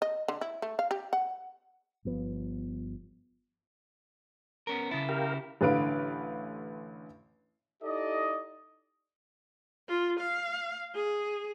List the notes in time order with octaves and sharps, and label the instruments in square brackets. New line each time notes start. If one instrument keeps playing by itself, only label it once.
[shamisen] D#5
D3
E4
A3
F5
G4
F#5
[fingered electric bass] G1 F3 B3
[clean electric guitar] B3 C#4 A#4
[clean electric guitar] C#3 E4 [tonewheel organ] A5
[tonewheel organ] G4 A#4 F5
[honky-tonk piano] A1 D3 B4 F5 D7
[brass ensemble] D#4 E4 G4 A4 D5 D#5
[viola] F4
F5
G#4